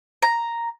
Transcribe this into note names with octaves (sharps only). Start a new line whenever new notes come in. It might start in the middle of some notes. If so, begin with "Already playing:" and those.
A#5